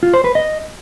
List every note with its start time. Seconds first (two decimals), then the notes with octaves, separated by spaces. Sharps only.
0.03 F4
0.14 C5
0.24 B4
0.35 D#5